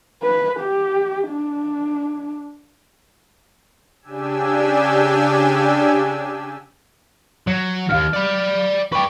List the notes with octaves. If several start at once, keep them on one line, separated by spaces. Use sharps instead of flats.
B4
G4
D4
C#3 D4 G4 G#5 E6
F#3 C#5
D#2 G#2 F5 F6
D5 B5
B4 D5 G5 C#6